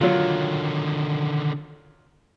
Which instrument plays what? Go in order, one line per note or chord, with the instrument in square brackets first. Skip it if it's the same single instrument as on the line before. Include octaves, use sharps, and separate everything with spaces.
[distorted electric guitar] D3 D#3 [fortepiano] F#3 F4